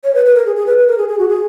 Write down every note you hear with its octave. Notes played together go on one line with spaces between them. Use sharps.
C#5
B4
B4
A#4
G#4
G#4
B4
B4
A#4
G#4
G#4
F#4
G#4